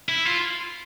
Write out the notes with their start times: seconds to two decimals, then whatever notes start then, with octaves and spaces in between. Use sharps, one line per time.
0.09 E4
0.26 F4